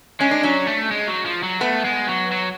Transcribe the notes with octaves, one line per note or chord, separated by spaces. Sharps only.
G#3 C#4
D4
F#3 C#4
A3
G#3
F#3
F3
F#3
A3 B3
G#3
F#3
F#3